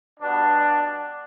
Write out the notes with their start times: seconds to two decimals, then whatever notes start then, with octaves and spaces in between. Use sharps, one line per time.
0.20 B2 G3 B3 D4